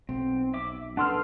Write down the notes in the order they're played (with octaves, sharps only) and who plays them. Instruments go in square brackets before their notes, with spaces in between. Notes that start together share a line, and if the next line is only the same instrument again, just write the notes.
[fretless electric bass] B1 [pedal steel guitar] C4
[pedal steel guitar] E5 D6
[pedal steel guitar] D4 A4 B4 [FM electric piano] F#5 C6 F6